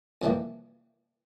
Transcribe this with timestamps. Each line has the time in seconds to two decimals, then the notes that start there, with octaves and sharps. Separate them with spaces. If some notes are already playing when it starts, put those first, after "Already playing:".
0.22 F2 C3 E3 G3 A#3